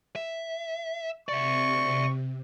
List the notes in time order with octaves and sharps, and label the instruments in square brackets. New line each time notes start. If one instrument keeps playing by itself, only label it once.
[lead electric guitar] E5
[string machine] C3 [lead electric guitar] D5 E5 [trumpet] C#6